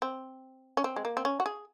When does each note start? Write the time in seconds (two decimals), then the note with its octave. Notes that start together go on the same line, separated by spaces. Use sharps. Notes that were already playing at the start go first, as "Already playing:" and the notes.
0.02 C4
0.77 C#4
0.84 C4
0.96 G#3
1.05 A#3
1.17 C4
1.25 C#4
1.40 F#4
1.46 G#4